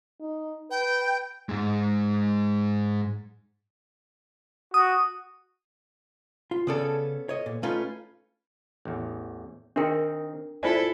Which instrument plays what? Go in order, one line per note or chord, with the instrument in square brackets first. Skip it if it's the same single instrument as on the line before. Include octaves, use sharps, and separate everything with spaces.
[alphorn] D#4
[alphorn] B4 [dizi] G5
[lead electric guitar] G#2 G#3
[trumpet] F#4 [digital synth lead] D#6
[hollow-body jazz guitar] F4
[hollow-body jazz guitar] C#3 D5 [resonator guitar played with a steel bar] B3 C#4 A4
[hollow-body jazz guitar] C#5 D#5
A#2
[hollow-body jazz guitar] A3 D#4 [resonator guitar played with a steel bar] C#4 F4 B4
[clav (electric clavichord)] A1 E2
[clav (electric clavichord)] D#3 C4 [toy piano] D4 A#4 G5
[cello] E4 A4 [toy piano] F4 C5 D5 [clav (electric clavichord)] G#5